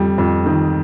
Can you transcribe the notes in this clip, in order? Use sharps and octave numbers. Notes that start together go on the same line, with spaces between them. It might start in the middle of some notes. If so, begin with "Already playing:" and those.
Already playing: F2 G3
F2
D#3